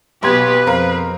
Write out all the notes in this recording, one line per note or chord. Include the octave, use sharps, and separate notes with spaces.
B1 B2 B3 G4 B4 C6 G#6
F2 C4 A#4 F5